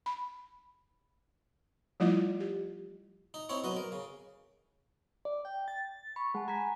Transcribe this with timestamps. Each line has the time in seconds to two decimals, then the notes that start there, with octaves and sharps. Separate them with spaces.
0.06 B5
2.00 F3 G3 A3 E4 F4 D#5
2.40 G4
3.34 D#4
3.49 C4 D#4 E4 C#5
3.64 B2 F#3 B4 D#5
3.77 A#4
3.92 C#3
5.25 D5
5.45 G5
5.68 A6
6.16 B5 C#6
6.34 G#3 F#5 A5
6.48 G#5 A#5 B6